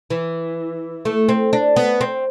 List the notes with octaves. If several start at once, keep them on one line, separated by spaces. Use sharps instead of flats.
E3
A3
C4
D4
B3
C4